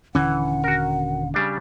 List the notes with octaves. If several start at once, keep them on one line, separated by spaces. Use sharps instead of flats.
D#1 D3 E3 C#4 F#5
F#4 A#4
C#3 G3 D4